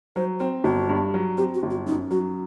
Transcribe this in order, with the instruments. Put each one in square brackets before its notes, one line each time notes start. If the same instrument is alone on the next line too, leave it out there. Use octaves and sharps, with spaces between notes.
[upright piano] F#3 [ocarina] C5
[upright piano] C4 [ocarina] C5
[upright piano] G1 [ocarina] F#4
[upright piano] G2
F#3
[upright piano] C4 [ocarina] G4
[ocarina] F#4
[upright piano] G1
[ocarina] F#4
[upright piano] F#2 [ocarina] D#4
[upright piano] F#3 [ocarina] F#4